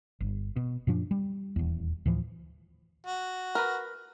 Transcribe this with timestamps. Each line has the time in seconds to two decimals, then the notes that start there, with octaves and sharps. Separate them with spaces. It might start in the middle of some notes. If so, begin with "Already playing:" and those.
0.20 G1
0.56 B2
0.87 F#2 A#2 F3 D4
1.11 G3
1.56 D#1 E2
2.06 D2 A2 E3 F3
3.06 F#4
3.55 A#4 B4